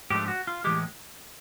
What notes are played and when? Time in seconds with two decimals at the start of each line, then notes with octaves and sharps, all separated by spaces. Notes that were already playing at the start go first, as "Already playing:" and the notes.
0.10 G#2 F3 A3 D4 G4
0.28 F#4
0.47 F4
0.64 A2 E3 G#3 G4